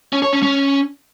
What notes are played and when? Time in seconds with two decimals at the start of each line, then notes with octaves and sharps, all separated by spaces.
0.13 C#4
0.23 C#5
0.33 C#4
0.43 C#4